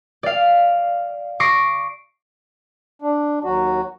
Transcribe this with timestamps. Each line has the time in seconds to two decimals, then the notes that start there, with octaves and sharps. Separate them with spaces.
0.23 D5 F5
1.40 C#6 D6 A#6 C7 D7
3.02 D4
3.45 D#2 F#3 F#4